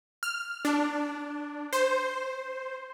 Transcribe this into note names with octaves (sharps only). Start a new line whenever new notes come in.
F6
D4
C5